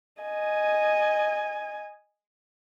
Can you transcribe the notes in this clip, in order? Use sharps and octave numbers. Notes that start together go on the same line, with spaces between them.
D#5 G#5